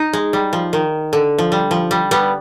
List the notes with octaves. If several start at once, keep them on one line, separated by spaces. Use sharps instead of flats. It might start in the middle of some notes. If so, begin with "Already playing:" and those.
Already playing: D#4
G#3
G3
F3
D#3
D3
F3
G3
F3
G3
G3 B3